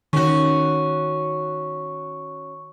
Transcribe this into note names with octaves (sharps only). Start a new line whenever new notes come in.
D#3 C#4 F#4 C#6